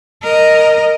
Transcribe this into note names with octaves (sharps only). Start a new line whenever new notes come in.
A#4 D#5